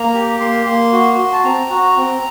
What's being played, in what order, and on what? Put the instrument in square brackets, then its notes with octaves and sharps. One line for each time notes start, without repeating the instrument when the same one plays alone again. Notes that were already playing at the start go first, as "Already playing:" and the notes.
Already playing: [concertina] A#3 A#5
G4
A#3 C6
A#3
F#4
F#4
A5
C4 A#5
F#4
C4